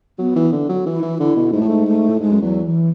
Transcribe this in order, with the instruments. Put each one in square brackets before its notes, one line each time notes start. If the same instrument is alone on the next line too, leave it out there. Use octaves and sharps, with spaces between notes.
[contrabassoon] F#3 [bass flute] B3
[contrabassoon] E3
D3
F#3
[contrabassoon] E3 [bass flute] E4
[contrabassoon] E3
[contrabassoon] D3 [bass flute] E4
[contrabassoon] B2
[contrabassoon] G#2 [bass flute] A3
[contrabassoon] A2
G#2
[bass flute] A3
[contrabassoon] A2
[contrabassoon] G#2 [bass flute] G#3
[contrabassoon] F#2
[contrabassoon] E2 [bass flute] F#3
[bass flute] E3